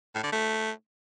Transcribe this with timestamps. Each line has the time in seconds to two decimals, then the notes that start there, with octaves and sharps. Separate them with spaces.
0.15 A2
0.24 D3
0.32 A3